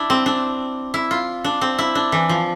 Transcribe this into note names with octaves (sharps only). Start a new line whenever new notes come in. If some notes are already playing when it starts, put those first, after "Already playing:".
Already playing: D4 E4
C4
D4
E4
F4
D4
C4
E4
D4
E3
F3